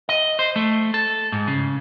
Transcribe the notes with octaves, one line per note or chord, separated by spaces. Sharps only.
D#5
C5
A3
A4
G#2
C#3